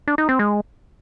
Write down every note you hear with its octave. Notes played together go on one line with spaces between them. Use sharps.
D4
D#4
C4
G#3